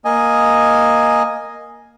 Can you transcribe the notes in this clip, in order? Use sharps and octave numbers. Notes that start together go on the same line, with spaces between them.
A#3 D#5 G#5